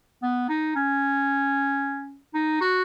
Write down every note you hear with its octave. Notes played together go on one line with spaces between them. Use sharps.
B3
D#4
C#4
D#4
F#4